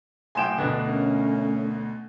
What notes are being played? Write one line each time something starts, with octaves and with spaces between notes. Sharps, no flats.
B1 A2 G5 G#5 C6 E7
D2 B2 A3 D4 B4
A#3 C#4